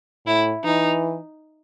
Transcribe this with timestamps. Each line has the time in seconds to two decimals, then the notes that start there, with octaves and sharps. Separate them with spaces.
0.26 A2 E4
0.64 E3 D#4